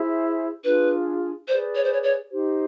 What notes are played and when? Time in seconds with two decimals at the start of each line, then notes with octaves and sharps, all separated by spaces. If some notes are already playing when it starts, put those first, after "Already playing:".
Already playing: E4 G#4 C5 E5
0.64 D4 F4 G#4 B4
1.48 G#4 B4 C5 D5
1.75 C#5
1.84 C5
1.93 C#5
2.03 C#5
2.31 D#4 G4 C5